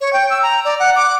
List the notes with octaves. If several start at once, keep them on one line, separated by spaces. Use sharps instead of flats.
C#5
G5
E6
A#5
D5
F#5
D6